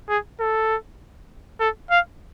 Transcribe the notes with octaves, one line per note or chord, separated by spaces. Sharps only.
G#4
A4
A4
F5